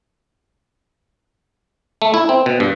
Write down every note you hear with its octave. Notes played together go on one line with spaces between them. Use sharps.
A3
E4
C4
B2
G2